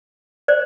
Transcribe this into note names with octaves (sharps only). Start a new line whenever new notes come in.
C5 D5